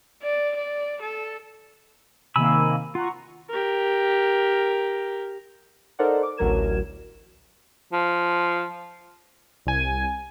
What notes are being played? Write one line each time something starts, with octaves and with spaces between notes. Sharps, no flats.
D5
D5
A4
C3 D#3 A#3 G#5 B5 E6
F4 F#5 A#5 C#6
G4 A#4
D#4 A4 A#4 C5 D5 F#5
D6
A1 D2 F#3 A#4 G#6 E7
F3
C2 G#5